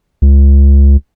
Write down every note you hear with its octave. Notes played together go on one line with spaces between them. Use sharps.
C#2